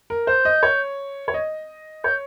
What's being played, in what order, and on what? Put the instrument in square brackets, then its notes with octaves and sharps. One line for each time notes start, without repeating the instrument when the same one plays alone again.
[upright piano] A#4
[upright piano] C5 [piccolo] G6
[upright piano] D#5
C#5
C#5
D#5
[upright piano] C#5 [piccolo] G6